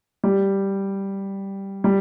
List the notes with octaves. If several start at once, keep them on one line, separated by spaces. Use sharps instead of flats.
G3
G3